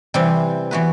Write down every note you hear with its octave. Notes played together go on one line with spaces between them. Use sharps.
C3 E3 G3 C4
E3 B3 F#4 B4